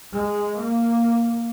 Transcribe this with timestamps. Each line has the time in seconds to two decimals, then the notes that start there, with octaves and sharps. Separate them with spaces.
0.13 G#3
0.57 A#3